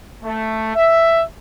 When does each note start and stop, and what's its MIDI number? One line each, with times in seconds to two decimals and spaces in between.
0.23 0.74 57
0.75 1.22 76